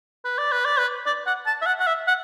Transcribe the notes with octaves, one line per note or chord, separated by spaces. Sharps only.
B4
D5
B4
D5
B4
D5
F#5
A5
E5
F#5
F#5
E5
F#5